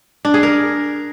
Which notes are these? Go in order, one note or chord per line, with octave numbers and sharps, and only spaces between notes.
D4
G#4
A#4